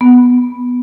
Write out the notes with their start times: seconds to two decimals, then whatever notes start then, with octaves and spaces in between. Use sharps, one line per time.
0.01 B3